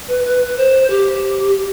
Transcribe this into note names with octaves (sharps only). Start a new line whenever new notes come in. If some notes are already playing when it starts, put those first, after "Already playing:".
B4
B4
B4
C5
G4